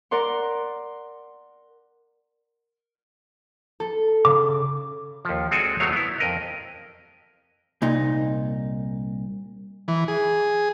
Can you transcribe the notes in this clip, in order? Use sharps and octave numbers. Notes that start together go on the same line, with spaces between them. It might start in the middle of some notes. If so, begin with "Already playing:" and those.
A#4 D5 F#5 C6
A4
C#3 D6
D#2 F3
G#3 C4 F#4 A4 D5 G#5
E2 F#3 G#3 A3 C#5 F5
B3 E4
F2 A#4 D#5
C2 A#2 D#4
E3
G#4